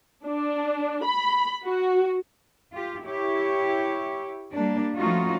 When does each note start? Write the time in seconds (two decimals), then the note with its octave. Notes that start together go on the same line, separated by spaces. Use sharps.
0.25 D4
1.05 B5
1.64 F#4
2.72 F4 G4
3.04 E4 G4 C#5
4.53 G3 A#3 D4
4.95 F3 A3 C#4 D#4 F4 F#4